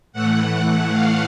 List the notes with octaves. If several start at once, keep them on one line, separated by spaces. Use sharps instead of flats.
A2 E3 A3 F#5
F5